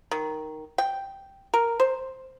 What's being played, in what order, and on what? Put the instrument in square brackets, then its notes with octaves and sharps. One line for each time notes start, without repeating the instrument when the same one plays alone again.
[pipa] D#3
G5
A#4
C5